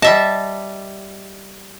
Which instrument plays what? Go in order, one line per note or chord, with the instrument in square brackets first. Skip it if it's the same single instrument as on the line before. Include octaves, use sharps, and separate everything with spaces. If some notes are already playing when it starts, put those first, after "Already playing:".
[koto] G3 E5 A5 [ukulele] D#5